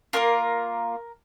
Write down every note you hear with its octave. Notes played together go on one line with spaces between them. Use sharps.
A#3 D4 F4 A#4